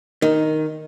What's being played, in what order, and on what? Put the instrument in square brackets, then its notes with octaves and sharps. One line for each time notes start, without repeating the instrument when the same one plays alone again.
[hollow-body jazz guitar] D#3